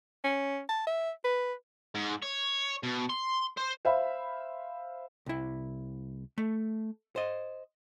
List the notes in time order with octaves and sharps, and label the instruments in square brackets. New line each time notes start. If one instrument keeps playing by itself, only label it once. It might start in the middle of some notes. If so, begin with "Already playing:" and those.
[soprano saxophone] C#4
A5
E5
B4
[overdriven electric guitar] G#2
C#5
B2
C6
C5
[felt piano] C5 E5 F5 B5
[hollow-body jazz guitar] C2 E4
A3
C5 D#5